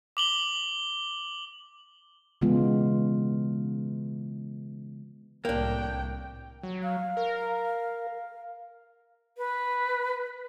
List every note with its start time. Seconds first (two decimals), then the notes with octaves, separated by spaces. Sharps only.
0.17 D6 F#7 G7
2.41 C#3 E3 G#3 B3 F4
5.45 C2 A2 A#3 D4 G5
6.63 F#3
6.83 F5
7.17 A#4
9.38 B4